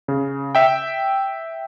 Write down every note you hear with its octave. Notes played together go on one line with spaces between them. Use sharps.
C#3
E5 G5